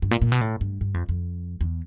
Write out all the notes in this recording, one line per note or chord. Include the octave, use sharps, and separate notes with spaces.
G2
A#2
A#2
B2
A2
G2
G2
F2
F2
E2